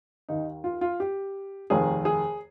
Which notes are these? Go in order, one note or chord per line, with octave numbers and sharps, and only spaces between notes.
D#2 D#3 D#4
F4
F4
G4
F1 D#2 D#3 G#4
G#4